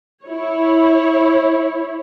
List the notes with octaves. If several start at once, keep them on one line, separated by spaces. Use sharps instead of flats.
E4 C#5